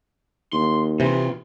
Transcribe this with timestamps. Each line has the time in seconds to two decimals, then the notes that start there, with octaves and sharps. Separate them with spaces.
0.53 D#2 C6
1.00 C3 E3 D#4 F4